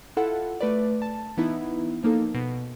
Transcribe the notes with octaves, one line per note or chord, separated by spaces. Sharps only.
E4 F4 A4 F#5
A3 B4 D5
A5
E3 B3 D#4 E4
F3 A#3 D#4 A4
B2